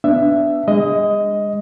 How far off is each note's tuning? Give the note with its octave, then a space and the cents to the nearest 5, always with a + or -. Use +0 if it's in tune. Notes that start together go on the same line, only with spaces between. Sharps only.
B3 +20 D4 +0 E5 +15
G#3 -30 D#5 +10